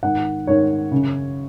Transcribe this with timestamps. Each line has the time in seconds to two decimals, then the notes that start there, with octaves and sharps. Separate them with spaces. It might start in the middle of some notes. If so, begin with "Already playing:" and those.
0.03 G#2 D#3 F#5
0.47 G#2 D#3 C#5
0.91 F#2 C#3